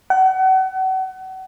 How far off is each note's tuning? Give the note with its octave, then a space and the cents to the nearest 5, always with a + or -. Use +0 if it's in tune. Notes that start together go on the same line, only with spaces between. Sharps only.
F#5 +35